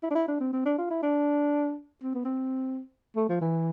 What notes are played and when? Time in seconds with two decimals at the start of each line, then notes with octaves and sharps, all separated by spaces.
0.03 E4
0.11 D4
0.15 E4
0.28 D4
0.40 C4
0.53 C4
0.66 D4
0.78 F4
0.90 E4
1.03 D4
2.03 C4
2.15 B3
2.25 C4
3.16 A3
3.29 F3
3.41 E3